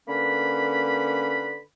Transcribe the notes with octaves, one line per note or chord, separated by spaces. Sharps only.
D3 A#3 C#4 B4 B5